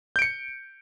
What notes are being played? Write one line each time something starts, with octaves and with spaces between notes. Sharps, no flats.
G6 C#7 D7